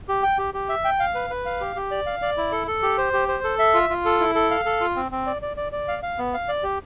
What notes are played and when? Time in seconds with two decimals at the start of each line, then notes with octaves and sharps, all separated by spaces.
0.09 G4
0.23 G5
0.39 G4
0.54 G4
0.69 E5
0.84 G5
0.99 F5
1.15 B4
1.30 B4
1.46 F5
1.61 G4
1.76 G4
1.91 D5
2.06 F5
2.22 D5
2.37 E4
2.52 A4
2.67 A4
2.82 G4
2.98 C5
3.13 G4
3.28 C5
3.44 A4
3.59 E5
3.74 F4
3.90 F4
4.05 A4
4.20 E4
4.35 A4
4.51 F5
4.65 A4
4.81 F4
4.96 C4
5.12 C4
5.27 D5
5.42 D5
5.57 D5
5.72 D5
5.88 F5
6.03 F5
6.19 B3
6.34 F5
6.48 D5
6.63 G4